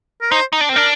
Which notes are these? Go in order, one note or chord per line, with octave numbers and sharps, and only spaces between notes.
A#4
D#4 C5
D#4
D4
C4
D4 A#4